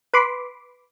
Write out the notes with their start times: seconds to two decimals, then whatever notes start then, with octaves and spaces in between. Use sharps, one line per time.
0.14 B4 B5 C6 D6